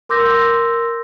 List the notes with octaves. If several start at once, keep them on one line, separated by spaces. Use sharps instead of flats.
A#4 C6 D6 E6 G6 A#6